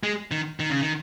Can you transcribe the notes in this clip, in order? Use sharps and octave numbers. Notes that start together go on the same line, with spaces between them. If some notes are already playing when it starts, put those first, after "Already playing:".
G#3
D#3
D#3
C#3
D#3